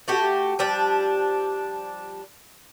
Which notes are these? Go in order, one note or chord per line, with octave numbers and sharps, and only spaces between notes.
A3 F#4 G4
F3 G3 D4